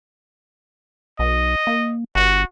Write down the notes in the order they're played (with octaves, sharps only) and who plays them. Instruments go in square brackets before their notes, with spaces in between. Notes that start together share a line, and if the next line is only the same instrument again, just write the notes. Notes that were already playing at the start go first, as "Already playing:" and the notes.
[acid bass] B1 [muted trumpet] D#5
[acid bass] A#3
[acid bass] G1 [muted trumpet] F#4